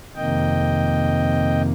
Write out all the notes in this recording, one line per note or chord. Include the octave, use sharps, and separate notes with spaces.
F2 C3 D#3 A#3 D#5 G5